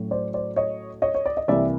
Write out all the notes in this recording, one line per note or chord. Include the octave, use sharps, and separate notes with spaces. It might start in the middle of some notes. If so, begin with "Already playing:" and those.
Already playing: A2 F#3 A3 C#4
C5 D5
C5 D5
C#5 D#5
C#5 D#5
C#5
D5
D#5
C2 C3 E3 G3 A#3 D5 E5